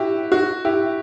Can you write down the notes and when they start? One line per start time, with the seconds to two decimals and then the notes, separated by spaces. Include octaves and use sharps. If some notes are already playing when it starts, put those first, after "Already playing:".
Already playing: E4 F#4 G4
0.32 F#4
0.65 E4 G4